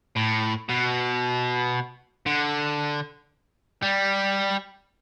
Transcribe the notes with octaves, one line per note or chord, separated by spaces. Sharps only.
A2
B2
D3
G3